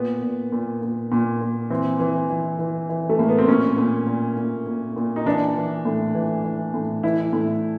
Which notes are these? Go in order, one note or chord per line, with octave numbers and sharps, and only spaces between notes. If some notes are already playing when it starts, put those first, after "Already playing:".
Already playing: A#2 B3
A#2
A#2
A#2
A#2
A#2
E3 C4
E3
E3
E3
E3
A3
A2 A#3
B3
C4
A#2 C#4
A#2
A#2
A#2
A#2
A#2
D#4
E3 D4
E3
A2
E3
E3
A2
E3 E4
A2